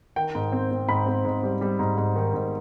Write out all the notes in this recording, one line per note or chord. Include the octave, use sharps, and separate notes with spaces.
D#3 G5
G#2
C4
C4
G#2 B5
C4
G#2
G3
G3
G#2
G#2
D#3
G#2